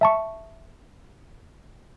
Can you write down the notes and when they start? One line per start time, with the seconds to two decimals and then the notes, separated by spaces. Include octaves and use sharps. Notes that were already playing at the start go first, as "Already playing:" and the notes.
0.01 E5 A5 C#6